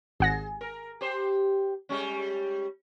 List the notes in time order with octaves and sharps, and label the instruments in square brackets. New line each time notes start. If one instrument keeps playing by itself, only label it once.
[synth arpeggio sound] G#1 F#5 A#6 [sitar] G#4
[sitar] A#4
G4 C5
G3 G#3 C#4